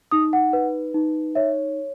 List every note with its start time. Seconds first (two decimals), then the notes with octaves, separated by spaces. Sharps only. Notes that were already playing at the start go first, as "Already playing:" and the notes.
0.11 D#4 D#6
0.33 F#5
0.53 B4
0.94 D#4
1.35 C#5 E5